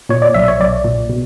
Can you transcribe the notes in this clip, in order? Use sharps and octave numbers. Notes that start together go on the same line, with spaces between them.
A#2 C#5
D5
B1 E5
C#5
B1 D5
A#2
B2